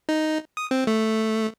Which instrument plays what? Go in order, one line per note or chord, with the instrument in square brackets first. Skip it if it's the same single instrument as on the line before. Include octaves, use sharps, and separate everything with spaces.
[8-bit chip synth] D#4
D#6
C4
A3